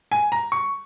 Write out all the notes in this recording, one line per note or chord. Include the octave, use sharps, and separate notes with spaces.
G#5
A#5
C#6